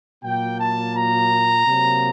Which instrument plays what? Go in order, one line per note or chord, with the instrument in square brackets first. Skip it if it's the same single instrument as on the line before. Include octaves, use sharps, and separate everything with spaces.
[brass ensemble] A#2 F#3 A#3 G5
A5
A#5
C3 F#3 A#3